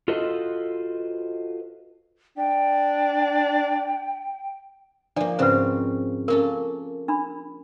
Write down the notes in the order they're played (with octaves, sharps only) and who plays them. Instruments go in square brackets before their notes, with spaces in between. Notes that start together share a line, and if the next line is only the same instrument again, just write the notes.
[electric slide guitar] F4 F#4 A4 B4 C5 D#5
[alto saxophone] D4 [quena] G5
[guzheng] F3 A#3 [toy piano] D4 D5
[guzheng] G#2 C#3 C4 [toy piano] B4 C5
[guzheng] A#3 C#4 A4 [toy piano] A#4
[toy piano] D4 B5